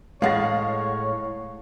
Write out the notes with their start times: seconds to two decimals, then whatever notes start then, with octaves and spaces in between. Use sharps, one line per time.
0.22 A2 G#3 C#5 F5 F#5 A#6